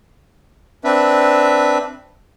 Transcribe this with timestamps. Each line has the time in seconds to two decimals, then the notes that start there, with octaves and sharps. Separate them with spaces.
0.84 C4 D4 B4 E5